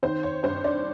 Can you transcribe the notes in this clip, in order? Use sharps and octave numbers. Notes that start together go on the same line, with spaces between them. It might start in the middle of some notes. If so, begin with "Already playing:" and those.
D#3 C5
C#5
G2 C5
D5